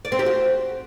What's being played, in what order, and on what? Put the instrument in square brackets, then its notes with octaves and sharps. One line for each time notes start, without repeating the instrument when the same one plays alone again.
[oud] D5
C4
G4
F#4